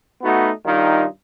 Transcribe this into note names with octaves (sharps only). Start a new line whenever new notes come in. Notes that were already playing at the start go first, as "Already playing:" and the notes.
A3 B3 D#4 F#4
G2 D#3 D#4 F4